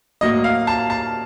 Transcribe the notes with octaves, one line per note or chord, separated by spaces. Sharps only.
A2 F#3 A#3 D#5
F5
A5
A5